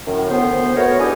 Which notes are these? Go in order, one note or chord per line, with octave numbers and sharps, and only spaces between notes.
F#2 A2 D#3
D2 B3 C5
A3 B3 F#4 A#4 C#5
C#2 D4 E4 G4 G#5 D#6